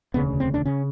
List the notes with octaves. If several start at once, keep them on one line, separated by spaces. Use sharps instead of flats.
E1 D2 C#3 B3
C4
D4
C#3 C#4